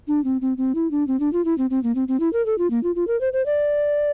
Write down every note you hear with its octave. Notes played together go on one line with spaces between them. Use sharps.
D4
C4
C4
C4
E4
D4
C4
D4
F4
E4
C4
C4
A#3
C4
C4
E4
A#4
A4
F4
A#3
F4
F4
A#4
C5
C5
D5